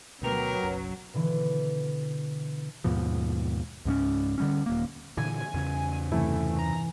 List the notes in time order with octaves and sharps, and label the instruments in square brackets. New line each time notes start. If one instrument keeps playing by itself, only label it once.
[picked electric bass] D2 B2 B3 [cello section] F#3 [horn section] G4 A#4 [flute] B4
[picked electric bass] F#1 B1 F#2
[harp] B2 D3 E3
[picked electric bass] D#2 G#2 B2 F3
C#2 G#2 A#3 C#4
D3 G3 C#4
D#1 A#3
[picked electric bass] A#2 D3 E3 [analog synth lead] G#5
[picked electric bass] E2 C#3
[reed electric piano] G2 C3 E4 [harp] E3 [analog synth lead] A3
[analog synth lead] A#5